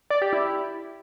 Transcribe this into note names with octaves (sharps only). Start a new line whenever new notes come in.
D5
G4
E4